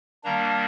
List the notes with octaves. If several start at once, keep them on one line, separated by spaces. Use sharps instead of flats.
D#3 G3 A#3 D4 A#5